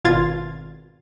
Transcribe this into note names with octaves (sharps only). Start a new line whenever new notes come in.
G#1 B2 F4 F5 G#6 A6